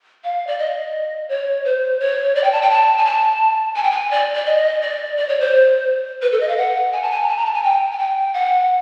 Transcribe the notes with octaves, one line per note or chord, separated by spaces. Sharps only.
F5
D5
D#5
C#5
C5
C#5
D5
G5
A5
G5
A5
G#5
A5
G#5
G5
G#5
D5
D5
D#5
D5
D5
C#5
C5
B4
A4
D#5
F5
F#5
G#5
A5
G#5
A#5
A5
A#5
A5
G#5
G5
G#5
G5
F#5